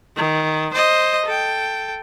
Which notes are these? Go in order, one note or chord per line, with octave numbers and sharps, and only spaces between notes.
D#3
C5 D#5
A4 G5